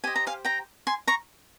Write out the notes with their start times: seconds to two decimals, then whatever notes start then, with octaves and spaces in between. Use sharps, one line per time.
0.04 G4 C5 D#5 G#5
0.16 A#5
0.27 F5 G#5
0.45 G5 A#5
0.87 G#5 C6
1.07 A#5 C#6